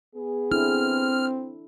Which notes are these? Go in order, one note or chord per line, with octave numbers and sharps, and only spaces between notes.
B3 G#4
C4 D4 E4 A4 F6